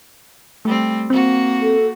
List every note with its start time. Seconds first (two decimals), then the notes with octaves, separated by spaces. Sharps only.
0.65 G3 A3 C4
1.10 A#3 C4 F#4
1.61 A4